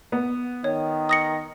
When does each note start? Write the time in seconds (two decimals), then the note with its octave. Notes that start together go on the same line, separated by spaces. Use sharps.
0.12 B3
0.64 D#3 C#5
1.09 D#6 A#6 C#7